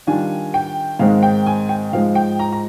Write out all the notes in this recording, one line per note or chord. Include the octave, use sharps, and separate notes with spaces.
D#3 G3 D4 F4 G#5
G5
G#2 D#3 G#3 C4 F5
G5
G#5
G5
G#2 F3 G#3 F5
G5
A#5
A#5